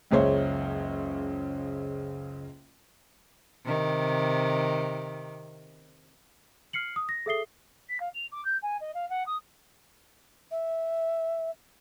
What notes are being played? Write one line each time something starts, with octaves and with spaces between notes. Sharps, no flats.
F#1 C#2 C#3 C5 C#5 E5
C3 D#3
F6 C7 C#7 F#7
D#6
A#6
G#4 A4 E5 D#6 C7 G7
B6
F5
F7
D6
G6
G#5
D#5
F5
F#5
D#6
E5